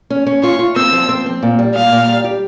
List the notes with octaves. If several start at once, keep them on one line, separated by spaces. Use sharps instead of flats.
C#4
C#4
F4 C#6
F4
C4 E6
F3
C4
C4
A#2
G3
A#2 F5
A#2
G3
G4